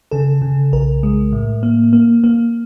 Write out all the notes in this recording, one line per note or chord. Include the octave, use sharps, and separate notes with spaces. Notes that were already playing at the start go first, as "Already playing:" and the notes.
C#3 A4
C#3
B1 A#4
G#3
A2
A#3
A#3
A#3